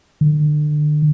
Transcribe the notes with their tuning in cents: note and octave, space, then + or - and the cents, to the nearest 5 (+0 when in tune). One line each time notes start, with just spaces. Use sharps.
D3 +35